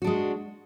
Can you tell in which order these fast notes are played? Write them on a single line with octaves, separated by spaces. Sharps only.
F#4 D4 G#3